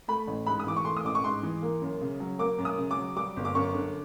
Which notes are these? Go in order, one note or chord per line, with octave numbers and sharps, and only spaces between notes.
A3 B5
A1
G#2 B5
D#6
E3 D6
C#6
A3 C6
D#6
A1 D6
C#6
G#2 C6
E3
A#3
F#2
C#3
F#3
A#3 D6
F#2
D#6
C#3
D6
F#3
G3 D6
G1
D6
F#2 C#6
D3